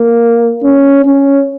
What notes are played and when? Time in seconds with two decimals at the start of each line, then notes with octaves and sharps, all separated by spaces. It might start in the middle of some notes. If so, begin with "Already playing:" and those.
Already playing: A#3
0.63 C#4
1.05 C#4